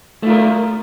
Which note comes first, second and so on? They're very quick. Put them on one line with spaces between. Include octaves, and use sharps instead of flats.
A3 F4 A#4